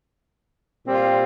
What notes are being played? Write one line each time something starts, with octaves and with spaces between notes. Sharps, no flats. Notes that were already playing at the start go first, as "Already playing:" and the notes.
A#2 G3 C4 F4